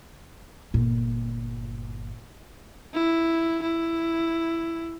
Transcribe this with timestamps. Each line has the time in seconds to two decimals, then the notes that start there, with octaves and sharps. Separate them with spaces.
0.74 G1 A#2
2.93 E4
3.62 E4